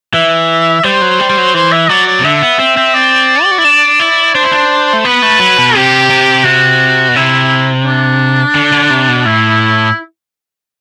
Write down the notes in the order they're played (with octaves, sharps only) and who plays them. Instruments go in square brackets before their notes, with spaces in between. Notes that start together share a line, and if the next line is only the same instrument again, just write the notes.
[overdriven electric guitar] E3 [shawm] E5
[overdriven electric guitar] G3 [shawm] C5
[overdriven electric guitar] F#3
G3
G3
F#3
[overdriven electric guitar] E3 [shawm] C5
[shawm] E5
[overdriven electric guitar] F#3 [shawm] D5
[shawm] D5
[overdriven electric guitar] C3
[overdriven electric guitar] D3 [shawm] E5
[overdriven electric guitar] B3
C4
C4
[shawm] D5
[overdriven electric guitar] G4
F#4
E4
D4
E4
[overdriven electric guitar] D4 [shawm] C5
[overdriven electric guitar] E4
D4
A3
[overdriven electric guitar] B3 [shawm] B4
[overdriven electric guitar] A3
F#3
B2
[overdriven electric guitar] C3 [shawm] G4
[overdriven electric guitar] C3
[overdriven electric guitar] C3 [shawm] F#4
[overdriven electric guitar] B2
[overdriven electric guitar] C3 [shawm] E4
[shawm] D4
[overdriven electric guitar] D3
D3
C3
B2
[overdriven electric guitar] A2 [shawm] E4